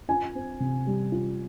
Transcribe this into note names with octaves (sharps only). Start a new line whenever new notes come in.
F4 G#5
C4
C3
G3
F4